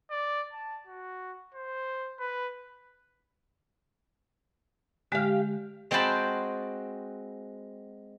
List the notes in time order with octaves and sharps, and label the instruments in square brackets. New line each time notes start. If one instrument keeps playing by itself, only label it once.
[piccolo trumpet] D5
A5
F#4
C5
B4
[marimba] D3 G#3 [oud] G4 F5
[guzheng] G#3 C4 F#4 G5 A5 B5